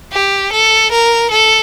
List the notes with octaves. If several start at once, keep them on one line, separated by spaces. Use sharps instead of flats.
G4
A4
A#4
A4